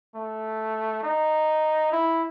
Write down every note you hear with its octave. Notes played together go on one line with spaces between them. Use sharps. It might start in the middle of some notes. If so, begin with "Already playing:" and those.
A3
D#4
E4